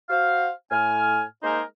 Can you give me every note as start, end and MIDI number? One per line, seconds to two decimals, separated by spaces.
0.10 0.48 66
0.10 0.48 72
0.10 0.48 77
0.71 1.21 45
0.71 1.21 80
0.71 1.21 89
1.43 1.61 56
1.43 1.61 58
1.43 1.61 63
1.43 1.61 68
1.43 1.61 70
1.43 1.61 72